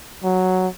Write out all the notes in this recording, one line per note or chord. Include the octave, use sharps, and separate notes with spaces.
F#3